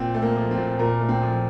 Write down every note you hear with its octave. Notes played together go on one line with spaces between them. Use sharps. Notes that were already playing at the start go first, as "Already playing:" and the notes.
Already playing: A#2 C4
A3
A#3
F3
C4
A#2
A#2 A#4
A3
C4
F3